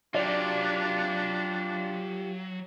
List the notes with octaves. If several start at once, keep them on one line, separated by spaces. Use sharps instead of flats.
F#3 D4 F4 G4 D5